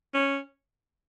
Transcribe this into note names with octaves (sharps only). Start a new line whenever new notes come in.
C#4